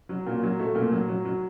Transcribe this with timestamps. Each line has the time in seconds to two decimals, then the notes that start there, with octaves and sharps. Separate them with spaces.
0.09 F#3
0.27 A#2
0.43 F#3
0.59 A3
0.75 A#2
0.92 F#3
1.08 F#3
1.25 F#3